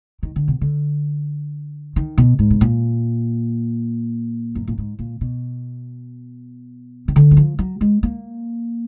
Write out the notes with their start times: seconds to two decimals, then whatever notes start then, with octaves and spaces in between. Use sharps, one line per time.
0.23 D#3
0.36 D3
0.48 B2
0.61 D3
1.96 D#3
2.18 B2
2.39 G#2
2.50 B2
2.61 A#2
4.55 F#2
4.67 A#2
4.78 G#2
4.99 A#2
5.21 B2
7.08 D#3
7.16 D3
7.31 F#3
7.37 F3
7.59 F#3
7.81 G#3
8.03 A#3